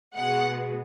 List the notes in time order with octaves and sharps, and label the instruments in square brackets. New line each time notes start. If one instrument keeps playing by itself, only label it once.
[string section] B2 G#3 B3 F#5